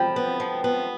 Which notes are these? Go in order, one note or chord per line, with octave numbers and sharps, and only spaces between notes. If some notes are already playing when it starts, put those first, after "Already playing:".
Already playing: F3 G5 B5
B3
F3
B3